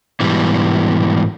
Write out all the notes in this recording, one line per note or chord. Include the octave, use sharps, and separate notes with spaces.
G#2 B2 E3 G3